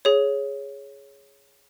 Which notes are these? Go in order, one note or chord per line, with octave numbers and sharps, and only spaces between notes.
G#4 C#5